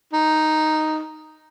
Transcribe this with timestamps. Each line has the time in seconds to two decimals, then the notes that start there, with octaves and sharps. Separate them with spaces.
0.13 D#4